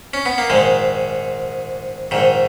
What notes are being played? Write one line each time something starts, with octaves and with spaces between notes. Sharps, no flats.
C#4
B3
A#3
A#1 G#2 D#3 G#3
A#1 G#2 D#3